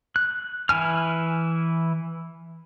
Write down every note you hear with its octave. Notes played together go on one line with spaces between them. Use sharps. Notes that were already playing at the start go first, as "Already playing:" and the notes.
F#6
E3 E4 G#5 F6